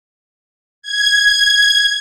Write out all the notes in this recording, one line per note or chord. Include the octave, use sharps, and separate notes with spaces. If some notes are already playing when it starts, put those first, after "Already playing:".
G#6